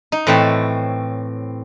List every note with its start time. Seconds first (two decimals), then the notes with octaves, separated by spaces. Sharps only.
0.12 D#4
0.27 A2 E3 C4 C#5 E5 A5